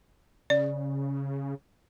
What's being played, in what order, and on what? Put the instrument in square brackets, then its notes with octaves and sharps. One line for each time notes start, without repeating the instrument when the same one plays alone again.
[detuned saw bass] C#3 [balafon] D5